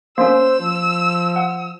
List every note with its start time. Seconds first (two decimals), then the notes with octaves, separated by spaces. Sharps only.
0.18 A#3 C#4 C5 E6
0.59 F3
1.36 F#5